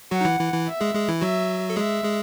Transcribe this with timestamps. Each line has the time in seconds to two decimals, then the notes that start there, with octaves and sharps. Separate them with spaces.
0.11 F#3 F#4 F#5
0.21 D#4
0.25 E3 E4
0.40 E3 E4
0.54 E3 E4
0.67 E5
0.81 G#3 G#4
0.95 G#3 G#4
1.08 E3 E4
1.21 F#3 F#4 E5
1.70 A4
1.76 G#3 G#4 E5
2.04 G#3 G#4